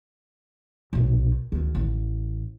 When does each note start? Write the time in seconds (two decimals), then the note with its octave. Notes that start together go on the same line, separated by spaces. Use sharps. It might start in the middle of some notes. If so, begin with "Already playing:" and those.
0.93 B1 A#2
1.52 D2 D#3
1.75 A1